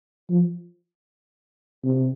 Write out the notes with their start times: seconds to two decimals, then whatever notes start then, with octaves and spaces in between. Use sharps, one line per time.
0.30 F3
1.84 C3